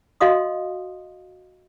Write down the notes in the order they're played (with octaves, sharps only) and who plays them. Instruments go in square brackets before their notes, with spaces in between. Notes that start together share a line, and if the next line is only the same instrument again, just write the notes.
[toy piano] F#4 D#5 F5 C6 D#6